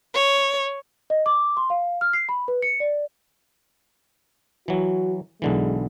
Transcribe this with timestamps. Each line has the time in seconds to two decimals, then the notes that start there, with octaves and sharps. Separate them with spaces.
0.14 C#5
1.10 D#5
1.26 D6
1.57 C6
1.70 F5
2.01 F6
2.13 C7
2.29 B5
2.48 B4
2.62 C#7
2.80 D5
4.68 E3 F#3 F#4
5.42 B1 D3 E3 G#3